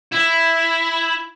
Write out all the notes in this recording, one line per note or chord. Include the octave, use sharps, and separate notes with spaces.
E4